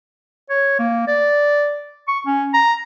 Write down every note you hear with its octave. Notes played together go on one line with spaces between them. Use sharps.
C#5
A#3
D5
C#6
C#4
A#5